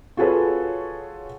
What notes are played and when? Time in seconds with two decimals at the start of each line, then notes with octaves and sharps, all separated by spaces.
0.17 F4 F#4 G#4 A4 B4 C#5